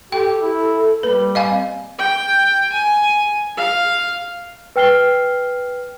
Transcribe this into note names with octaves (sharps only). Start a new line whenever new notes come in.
G4 A4 G5
E4
G3 A#3 B4
D#5 F5 G#5
C4
G5
G#5
F5
B4 G5 F6 C7 G7